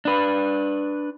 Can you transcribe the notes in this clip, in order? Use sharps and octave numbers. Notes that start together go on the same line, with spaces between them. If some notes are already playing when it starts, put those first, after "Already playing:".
D4 B4